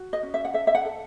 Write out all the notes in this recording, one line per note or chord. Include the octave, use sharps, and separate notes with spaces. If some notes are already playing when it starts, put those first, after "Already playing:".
Already playing: F#4
D#5
C#4
E5
F#5
A4 E5
E5
F#5
A4